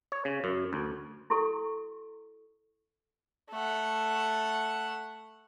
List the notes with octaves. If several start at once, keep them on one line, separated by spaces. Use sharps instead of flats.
C#5
C#3
F#2
D2
E4 F#4 A4 C#6
A3 F#5